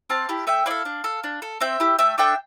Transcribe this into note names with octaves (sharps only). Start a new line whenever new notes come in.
C4 F5 A5
E4 G4
A3 E5 G5
E4 A4 D5 F5
D4
A4
D4
A4
C4 E5 G5
E4 G4
A3 E5 G5
D4 A4 E5 G5